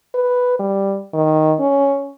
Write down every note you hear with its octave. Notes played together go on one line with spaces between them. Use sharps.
B4
G3
D#3
C#4